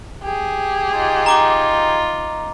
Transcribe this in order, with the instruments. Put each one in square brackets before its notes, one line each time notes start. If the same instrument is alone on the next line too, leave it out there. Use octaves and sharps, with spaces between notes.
[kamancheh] G4 G#4
[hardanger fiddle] D#4 F4
[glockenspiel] A#5 D6 G7